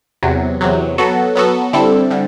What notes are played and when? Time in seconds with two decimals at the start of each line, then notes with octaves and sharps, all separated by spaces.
0.23 E2 C3 F#3
0.61 E2 C3 F#3
0.98 F#3 B3 F#4 A4
1.35 F#3 B3 F#4 A4
1.73 D3 G3 C4 E4 A4
2.10 D3 G3